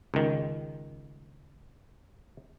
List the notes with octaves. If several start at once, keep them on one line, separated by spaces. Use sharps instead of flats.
C#2 D#3